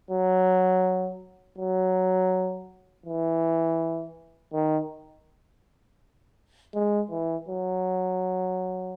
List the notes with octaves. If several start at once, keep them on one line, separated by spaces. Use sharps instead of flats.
F#3
F#3
E3
D#3
G#3
E3
F#3